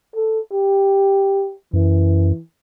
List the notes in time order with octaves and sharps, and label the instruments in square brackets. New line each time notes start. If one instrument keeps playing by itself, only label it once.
[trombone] A4
G4
[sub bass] F#2 [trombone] E3